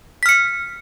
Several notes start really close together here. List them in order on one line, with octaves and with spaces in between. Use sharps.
B6 F6 C#7